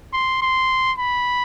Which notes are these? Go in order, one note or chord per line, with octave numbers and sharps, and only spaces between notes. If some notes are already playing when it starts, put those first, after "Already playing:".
C6
C6
B5